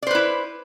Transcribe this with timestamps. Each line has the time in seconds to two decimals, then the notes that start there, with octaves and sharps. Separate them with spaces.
0.02 D5
0.07 C5
0.11 B4
0.15 E4